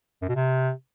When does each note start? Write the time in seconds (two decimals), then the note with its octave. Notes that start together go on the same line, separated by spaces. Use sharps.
0.22 F#2
0.29 B2
0.35 C3